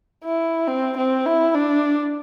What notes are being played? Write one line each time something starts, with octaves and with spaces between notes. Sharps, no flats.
E4
C4
C4
E4
D4